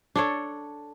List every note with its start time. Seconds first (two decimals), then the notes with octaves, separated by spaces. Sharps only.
0.16 D4 A4 C#5